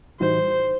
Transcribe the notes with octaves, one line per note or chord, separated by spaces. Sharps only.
A2 E3 G3 D#4 F#4 C5